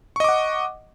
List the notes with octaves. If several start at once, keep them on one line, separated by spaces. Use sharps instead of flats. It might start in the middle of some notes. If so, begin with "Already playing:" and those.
D#5 F#5 C#6 D6